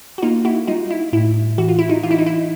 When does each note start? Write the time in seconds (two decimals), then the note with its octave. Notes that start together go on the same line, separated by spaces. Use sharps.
0.18 F#4
0.22 A#3 D#4 F4
0.45 E4 F#4
0.67 G3 D#4 F4
0.90 E4
1.13 A2 E4
1.58 E3 F#4
1.69 F4
1.79 E4
1.89 D#4 F4
2.03 E3 F4
2.11 E4
2.19 D#4
2.26 E4